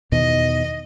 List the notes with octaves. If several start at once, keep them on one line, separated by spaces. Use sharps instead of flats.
E2 B2 D#3 D#5